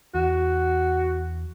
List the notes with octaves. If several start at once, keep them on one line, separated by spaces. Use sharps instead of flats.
E2 F#4